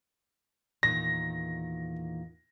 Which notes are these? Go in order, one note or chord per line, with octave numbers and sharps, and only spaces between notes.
E2 A#2 D#3 A#6